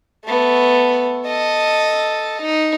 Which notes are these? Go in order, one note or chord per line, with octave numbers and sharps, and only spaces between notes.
A3 B3
A4 D#5
D#4